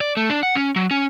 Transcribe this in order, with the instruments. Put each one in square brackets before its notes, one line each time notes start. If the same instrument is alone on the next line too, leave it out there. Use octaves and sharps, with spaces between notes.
[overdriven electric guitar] D5
A3
D4
F#5
C#4
F#3
C#4